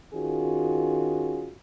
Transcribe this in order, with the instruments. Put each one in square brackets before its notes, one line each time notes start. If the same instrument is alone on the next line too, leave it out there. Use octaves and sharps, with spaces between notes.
[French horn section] D#3 C#4 F4 F#4 G#4